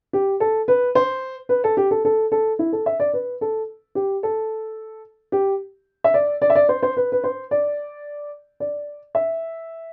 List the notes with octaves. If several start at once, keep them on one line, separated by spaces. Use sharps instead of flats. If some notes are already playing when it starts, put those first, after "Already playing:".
G4
A4
B4
C5
B4
A4
G4
A4
A4
A4
E4
A4
E5
D5
B4
A4
G4
A4
G4
E5
D5
D5
E5
D5
C5
C5
B4
B4
C5
D5
D5
E5